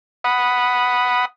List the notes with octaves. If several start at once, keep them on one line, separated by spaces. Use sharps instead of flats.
F#5 B5 D#6